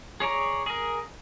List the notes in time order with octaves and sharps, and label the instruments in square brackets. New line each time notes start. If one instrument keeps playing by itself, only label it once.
[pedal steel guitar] G#4 C#5 D5 A#5
G#4 A#4